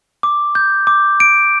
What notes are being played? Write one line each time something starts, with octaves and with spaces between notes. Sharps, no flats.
D6
G6
D6
D7